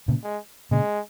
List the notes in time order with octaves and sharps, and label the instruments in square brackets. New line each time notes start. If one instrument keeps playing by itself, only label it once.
[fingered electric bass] A#2 C#3
[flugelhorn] G#3
[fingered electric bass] A#2 C#3 [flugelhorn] G#3